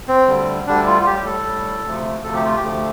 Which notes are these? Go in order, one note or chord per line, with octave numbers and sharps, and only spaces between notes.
C4
D2 D3 G3
D2 D3 G3 D4
F4
F4
A2 G3 G4
A4
A2 G3
D2 C3 F3 A3
D2 C3 F3 A3 A4
G4
F4
G4
D2 D3 F3 A3